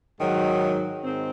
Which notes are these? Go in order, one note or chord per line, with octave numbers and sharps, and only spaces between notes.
G#2 D#3 F#3
G#2 D#3 G#3 C4